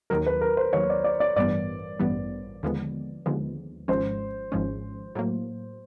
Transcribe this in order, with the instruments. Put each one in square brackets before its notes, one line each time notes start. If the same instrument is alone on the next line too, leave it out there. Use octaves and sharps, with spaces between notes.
[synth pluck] D#2 D#3 F#3 [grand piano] A#4
[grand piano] B4
A#4
C5
[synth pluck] D#2 D#3 F#3 [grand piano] C#5
[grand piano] D5
D5
D5
[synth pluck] A1 G2 E3 G3 B3 [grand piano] D5
[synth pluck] A1 G2 E3 G3 B3
D#2 D3 F3 G#3 B3
D#2 D3 F3 G#3 B3
[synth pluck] G#1 G#2 F3 G#3 C#4 [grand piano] C5
[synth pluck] G#1 G#2 F3 G#3 C#4
A2 F#3 A#3